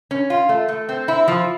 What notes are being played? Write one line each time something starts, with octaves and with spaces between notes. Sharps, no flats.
C#4
F4
A3
A3
C4
E4
F3